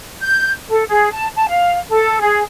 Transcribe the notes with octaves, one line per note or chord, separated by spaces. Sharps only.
G6
A4
G#4
A5
A5
F5
A4
G#4